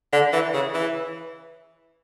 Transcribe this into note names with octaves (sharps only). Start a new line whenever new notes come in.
D3
E3
C#3
E3